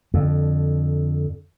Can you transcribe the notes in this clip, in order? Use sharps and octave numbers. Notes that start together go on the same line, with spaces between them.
F2 D3